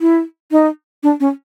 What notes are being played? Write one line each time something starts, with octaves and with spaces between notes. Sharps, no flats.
E4
D#4
D4
C#4